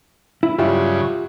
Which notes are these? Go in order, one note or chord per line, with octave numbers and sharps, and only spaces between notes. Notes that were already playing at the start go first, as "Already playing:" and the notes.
E4
G2 C#3 F#3 F4 G4 E5